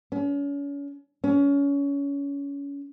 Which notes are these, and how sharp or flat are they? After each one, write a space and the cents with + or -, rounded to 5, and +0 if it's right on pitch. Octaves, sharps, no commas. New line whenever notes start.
C#4 +35
C#4 +25